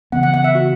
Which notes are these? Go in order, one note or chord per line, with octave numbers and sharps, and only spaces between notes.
C#3 E3 B3 F#5
F#5
F#5
E5
F#4